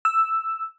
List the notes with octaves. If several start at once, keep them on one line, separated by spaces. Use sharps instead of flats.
E6